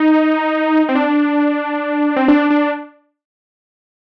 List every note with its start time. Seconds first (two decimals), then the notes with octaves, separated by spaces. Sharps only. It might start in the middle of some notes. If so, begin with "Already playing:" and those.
Already playing: D#4
0.89 C4
0.95 D4
2.16 C4
2.28 D4
2.50 D4